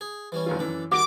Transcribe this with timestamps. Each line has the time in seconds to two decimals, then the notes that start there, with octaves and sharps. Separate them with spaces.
0.01 G#4
0.32 E3 G3 C#4
0.46 F1 D#3 F4
0.59 F#2 E3 D4 A4
0.92 D#3 G3 F#4 C#6 D6